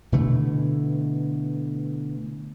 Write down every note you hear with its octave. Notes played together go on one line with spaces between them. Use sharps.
B2 D3 E3 A3